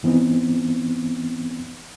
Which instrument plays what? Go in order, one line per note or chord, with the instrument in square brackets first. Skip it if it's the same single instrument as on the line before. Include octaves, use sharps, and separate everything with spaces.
[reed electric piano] G2 E3 B3 C4 D#4